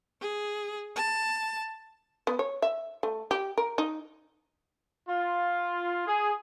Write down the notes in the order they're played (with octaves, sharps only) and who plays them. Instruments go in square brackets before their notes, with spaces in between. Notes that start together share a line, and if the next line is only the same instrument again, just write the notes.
[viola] G#4
A5
[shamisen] B3
C#5
E5
A3
G4
A#4
D#4
[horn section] F4
G#4